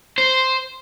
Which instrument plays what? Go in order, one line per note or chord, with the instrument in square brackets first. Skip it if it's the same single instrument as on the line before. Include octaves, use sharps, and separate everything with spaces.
[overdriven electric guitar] C5